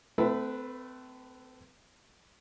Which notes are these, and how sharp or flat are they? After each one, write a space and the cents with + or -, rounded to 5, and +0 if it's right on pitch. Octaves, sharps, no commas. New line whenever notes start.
A3 +0 C4 -35 B4 +0